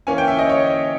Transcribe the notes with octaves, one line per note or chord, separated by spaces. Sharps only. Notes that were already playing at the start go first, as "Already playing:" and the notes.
E3 A#3 C#4 G#5
G5
E5
D#5
C#5